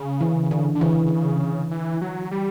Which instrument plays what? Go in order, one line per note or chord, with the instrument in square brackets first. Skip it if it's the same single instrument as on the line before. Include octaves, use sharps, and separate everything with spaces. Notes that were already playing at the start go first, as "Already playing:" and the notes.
Already playing: [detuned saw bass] C#3
[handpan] E3
D3
[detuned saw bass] D3
[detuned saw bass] C#3 [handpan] E3
[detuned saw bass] E3
F#3
G3